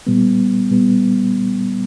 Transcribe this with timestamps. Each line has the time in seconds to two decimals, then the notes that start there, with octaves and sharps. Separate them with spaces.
0.07 A#2 G3 B3
0.71 A#2 G3 B3